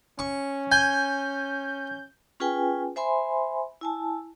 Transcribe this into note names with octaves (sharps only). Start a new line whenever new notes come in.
C#4 C#6
G#5 G6
C#4 F4 G#4 B4 G5 G#5
C5 E5 G#5 B5 C6
E4 G#5 A5